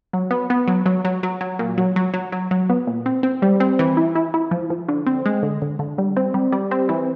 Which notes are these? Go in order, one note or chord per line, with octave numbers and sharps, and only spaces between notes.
F#3
B3
B3
F#3
F#3
F#3
F#3
F#3
A#2
F#3
F#3
F#3
F#3
F#3
B3
A#2
C4
C4
G3
C4
E3
E4
E4
E4
F3
F3
D3
C4
G#3
D3
D3
D3
G3
C4
G3
G3
C4
E3